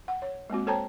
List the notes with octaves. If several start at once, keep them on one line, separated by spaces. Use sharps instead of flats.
F#5
C#5
G#3 A#3 C4 F#4
A4 C5 C#5 G5 A5 A#5